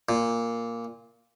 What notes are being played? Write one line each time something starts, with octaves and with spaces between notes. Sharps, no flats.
A#2